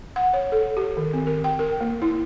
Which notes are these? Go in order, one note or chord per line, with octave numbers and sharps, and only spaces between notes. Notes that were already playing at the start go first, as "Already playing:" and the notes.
F#5
C#5
A4
G4
D#3
C4
A#4
G5
A#4
A#3
E4